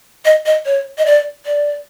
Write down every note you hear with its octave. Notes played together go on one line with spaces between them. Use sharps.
D#5
D#5
C#5
D#5
D5
D5